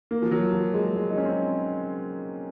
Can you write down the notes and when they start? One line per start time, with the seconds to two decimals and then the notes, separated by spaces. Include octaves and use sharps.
0.11 A#3
0.22 F3
0.31 F#3
0.54 F3
0.74 G#3
0.96 G#3
1.10 D#4
1.17 C#4
1.25 C4